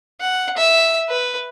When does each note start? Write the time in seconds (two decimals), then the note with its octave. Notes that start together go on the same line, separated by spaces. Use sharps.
0.21 F#5
0.57 E5
1.09 B4